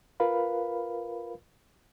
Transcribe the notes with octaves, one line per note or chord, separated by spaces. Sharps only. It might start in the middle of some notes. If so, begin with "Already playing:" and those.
F4 A#4 B4 F5 B5